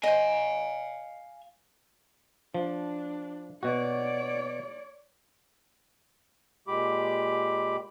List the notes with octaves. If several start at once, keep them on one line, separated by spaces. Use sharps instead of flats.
C5 D#5 F5 G#5
F3 D4
B2 F#4 C#5 D5
A#2 G#3 G4 B5 D6